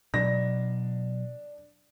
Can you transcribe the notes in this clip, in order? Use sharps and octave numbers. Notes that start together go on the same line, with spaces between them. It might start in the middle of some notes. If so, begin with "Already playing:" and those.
B2 F#3 D4 A#6